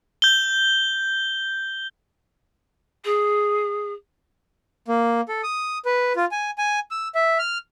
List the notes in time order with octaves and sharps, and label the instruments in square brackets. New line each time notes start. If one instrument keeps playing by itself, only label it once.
[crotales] G6 G7
[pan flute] G#4
[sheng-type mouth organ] A#3
A4
D#6
B4
F4
G#5
G#5
E6
E5
F6